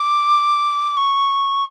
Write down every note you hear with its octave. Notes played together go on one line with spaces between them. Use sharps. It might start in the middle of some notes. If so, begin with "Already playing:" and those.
Already playing: D6
C#6